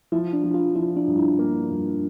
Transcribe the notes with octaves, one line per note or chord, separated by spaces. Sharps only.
F3 E4
D4
F3
F4
F3 E4
D4
G2
E4
A#3
G2